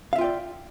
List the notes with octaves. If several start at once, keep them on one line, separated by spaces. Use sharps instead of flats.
F4 D5 E5 F5 G5